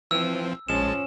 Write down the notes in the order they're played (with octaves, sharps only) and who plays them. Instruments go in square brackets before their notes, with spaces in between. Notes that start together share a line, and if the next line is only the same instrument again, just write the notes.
[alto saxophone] E3 [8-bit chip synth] F3 C4 [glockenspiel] E6
[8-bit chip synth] A#1 G#3 A5 [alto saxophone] F3 [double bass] C#4 [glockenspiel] E7